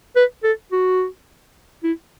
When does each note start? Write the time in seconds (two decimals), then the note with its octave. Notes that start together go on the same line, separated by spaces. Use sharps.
0.16 B4
0.43 A4
0.72 F#4
1.83 E4